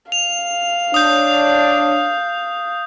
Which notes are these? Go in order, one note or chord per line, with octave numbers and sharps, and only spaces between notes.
F5 F7
D4 C#5 D#6 G6